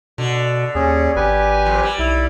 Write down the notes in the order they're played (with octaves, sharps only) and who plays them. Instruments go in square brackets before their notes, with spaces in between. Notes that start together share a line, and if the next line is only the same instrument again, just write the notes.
[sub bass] B2 [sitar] D3
[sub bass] D#2 [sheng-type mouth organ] C#4 G#4
[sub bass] G#1 [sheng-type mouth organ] G4 B4 G#5
[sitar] F2 A#2
G3
[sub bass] B1 [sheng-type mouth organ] E4